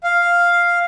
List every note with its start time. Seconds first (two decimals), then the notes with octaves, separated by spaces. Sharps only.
0.04 F5